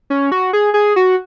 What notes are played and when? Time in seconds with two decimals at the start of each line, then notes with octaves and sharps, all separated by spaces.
0.10 C#4
0.32 F#4
0.53 G#4
0.74 G#4
0.96 F#4